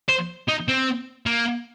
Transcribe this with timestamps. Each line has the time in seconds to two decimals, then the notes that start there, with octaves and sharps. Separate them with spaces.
0.09 C5
0.48 D#4
0.68 C4
1.26 A#3